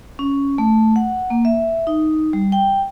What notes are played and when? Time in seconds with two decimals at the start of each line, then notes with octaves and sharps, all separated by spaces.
0.19 C#4
0.58 A3
0.96 F#5
1.30 A#3
1.45 E5
1.87 D#4
2.33 G3
2.52 G5